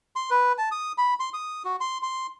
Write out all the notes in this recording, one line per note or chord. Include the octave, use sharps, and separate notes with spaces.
C6
B4
A5
D#6
B5
C6
D#6
F#4
C6
C6